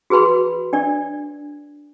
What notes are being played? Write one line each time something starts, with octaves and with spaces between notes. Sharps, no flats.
F#4 G#4 B4 B5 C6
D4 D5